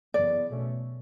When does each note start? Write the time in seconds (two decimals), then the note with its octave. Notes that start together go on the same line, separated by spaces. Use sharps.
0.14 F#2 C#3 E3 B3 D5
0.50 B2 A3 C#4